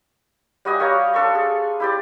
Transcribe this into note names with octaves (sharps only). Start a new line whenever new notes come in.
G3 F#4 D#5 G#5
G4 C#5 F5 A#5
D4 A4 C6 C#6
G#4
E4 G4 D5